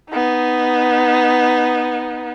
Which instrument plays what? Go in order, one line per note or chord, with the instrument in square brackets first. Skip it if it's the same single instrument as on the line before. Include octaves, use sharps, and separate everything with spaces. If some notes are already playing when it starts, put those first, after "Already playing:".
[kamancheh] B3 D#4